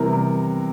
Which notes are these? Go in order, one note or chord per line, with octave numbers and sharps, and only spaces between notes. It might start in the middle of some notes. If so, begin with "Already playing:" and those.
Already playing: C3 E3 G3 B3 A#4